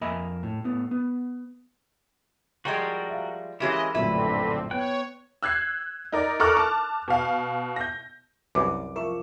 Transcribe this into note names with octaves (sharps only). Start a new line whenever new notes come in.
F2 A#3 D#5 E5 G#5 B5
A2
A2 B3
B3
F3 G3 G#3 F#4 A#4 G5
E5 F5
E3 G#3 A#3 C#4 E4 G4 D#5 E5
A#1 F#2 A2 D3 C4 E4 B4
B3 C#5 G5 F#6
E6 F#6 G#6 C7
D#4 A#4 D5
A4 A#4 C#6 D6 F6 F#6
A5 D6 F6
B2 F5
G6 A#6
C2 F#2 B4 D6
F3 A#4 E5 C#6 E7